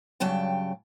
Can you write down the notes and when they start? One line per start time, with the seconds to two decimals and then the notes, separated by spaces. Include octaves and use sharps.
0.20 G2 C#3 F#3 G5 A5